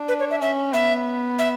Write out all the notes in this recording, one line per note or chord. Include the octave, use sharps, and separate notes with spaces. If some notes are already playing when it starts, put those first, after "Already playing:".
Already playing: D4
B4
C#5
E5
C#4 E5
B3 E5
E5